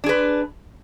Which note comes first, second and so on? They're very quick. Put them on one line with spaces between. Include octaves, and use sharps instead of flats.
D4 G#4 B4